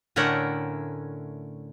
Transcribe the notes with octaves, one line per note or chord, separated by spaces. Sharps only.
A2 D3 A3 C#4 A#4 F#5